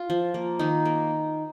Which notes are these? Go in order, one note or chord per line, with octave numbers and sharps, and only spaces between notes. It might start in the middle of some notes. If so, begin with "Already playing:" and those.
Already playing: F4
F3
A#3
D#3 D#4
A#3